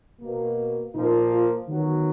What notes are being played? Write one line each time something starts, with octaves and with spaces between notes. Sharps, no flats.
B2 A#3
A#2 F3 A#3 D#4
F4
D#3 F#3 B3 F#4